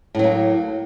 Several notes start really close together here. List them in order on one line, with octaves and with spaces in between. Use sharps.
A2 F#3 A#3